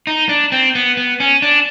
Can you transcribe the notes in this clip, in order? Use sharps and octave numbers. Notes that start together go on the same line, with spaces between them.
D#4
D4
C4
B3
B3
C#4
D4